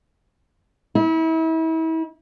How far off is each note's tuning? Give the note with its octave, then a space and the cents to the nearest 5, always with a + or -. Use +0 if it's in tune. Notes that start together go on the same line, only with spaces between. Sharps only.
E4 -35